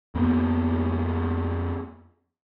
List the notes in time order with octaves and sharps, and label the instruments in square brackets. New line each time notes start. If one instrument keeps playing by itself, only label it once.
[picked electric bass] F2 A#3 B3